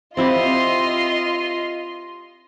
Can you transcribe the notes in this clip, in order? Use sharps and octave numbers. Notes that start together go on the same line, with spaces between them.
C4 E4 F4 G4 D#5 C6